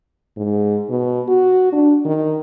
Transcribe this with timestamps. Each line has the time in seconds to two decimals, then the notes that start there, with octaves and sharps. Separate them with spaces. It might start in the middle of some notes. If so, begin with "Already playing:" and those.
0.37 G#2
0.90 B2
1.28 F#4
1.72 D4
2.05 D#3